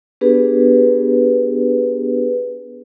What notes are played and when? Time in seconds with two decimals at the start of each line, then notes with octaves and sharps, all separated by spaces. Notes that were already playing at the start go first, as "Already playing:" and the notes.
0.21 B3 D4 G4 G#4 B4